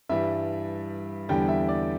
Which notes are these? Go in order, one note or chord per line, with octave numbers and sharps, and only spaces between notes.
G2 E3 G3 E5
E2 D3 G3 G5
E5
D5